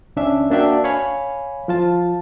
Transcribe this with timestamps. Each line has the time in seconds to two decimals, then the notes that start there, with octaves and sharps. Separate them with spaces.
0.16 C#2 C#4 D4 E5
0.50 A#3 D4 F#4 E5 G5
0.84 C#5 F5 G#5 B5
1.68 F3 F4 A5